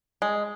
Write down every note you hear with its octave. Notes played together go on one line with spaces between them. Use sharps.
G#3